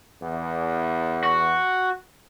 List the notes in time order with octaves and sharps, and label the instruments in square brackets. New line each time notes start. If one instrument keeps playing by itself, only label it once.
[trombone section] E2
[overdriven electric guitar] F#4